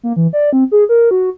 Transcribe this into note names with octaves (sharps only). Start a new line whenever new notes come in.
A#3
E3
D5
C4
G#4
A#4
F#4